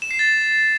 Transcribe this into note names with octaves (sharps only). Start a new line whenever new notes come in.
E7
C7
A6